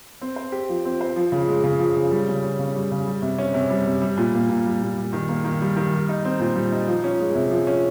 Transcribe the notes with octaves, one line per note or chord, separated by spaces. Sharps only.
C4
C5
G4
F3
C4
C5
F3
C#3
G#3
C#3
F3
C#3
G3
C#3
C#4
C#3
G3
C#3
G3
C3
C#4
C3
G3
C3
G3
A#2
A#3
A#2
G3
A#2
G3
D#3
A#3
D#3
G3
D#3
G3
D#4
C4
A#2
G3
D#4
F3
C#4
G#3
C3
F3
C#4